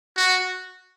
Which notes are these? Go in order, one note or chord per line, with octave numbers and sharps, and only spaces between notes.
F#4